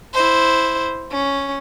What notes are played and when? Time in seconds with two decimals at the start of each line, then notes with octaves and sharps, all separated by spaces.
0.13 E4 C5
1.12 C#4